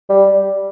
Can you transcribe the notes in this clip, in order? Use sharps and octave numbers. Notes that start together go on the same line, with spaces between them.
G3